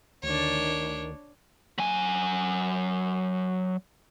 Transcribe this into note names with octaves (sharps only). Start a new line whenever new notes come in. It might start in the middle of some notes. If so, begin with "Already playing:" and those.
D2 D#3 D4 C#5
F#3 G#5